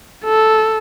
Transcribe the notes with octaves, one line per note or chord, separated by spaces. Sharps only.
A4